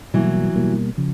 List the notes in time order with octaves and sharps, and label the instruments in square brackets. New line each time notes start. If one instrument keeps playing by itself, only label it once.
[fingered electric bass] B2 G3 A#3 [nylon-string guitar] E3 F#3
[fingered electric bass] B2 G3 A#3
C#3 F3